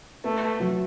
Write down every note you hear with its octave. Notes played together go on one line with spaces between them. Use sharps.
A3 B3
F#3